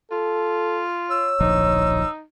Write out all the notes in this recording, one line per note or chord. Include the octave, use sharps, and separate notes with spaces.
F4 A4
C#5 E6
D1 A#1 F3 D#4